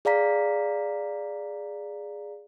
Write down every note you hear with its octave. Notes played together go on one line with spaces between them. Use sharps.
G#4 D5 F5 A#5 B6